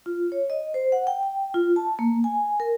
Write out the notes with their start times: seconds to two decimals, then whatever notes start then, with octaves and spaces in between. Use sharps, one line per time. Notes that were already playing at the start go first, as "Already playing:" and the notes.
0.06 F4
0.32 C#5
0.50 D#5
0.74 C5
0.92 F#5
1.07 G5
1.23 G5
1.54 F4
1.76 A5
1.99 A#3
2.24 G#5
2.60 A#4